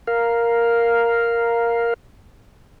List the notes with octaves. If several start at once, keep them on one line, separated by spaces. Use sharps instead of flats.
A#4 F5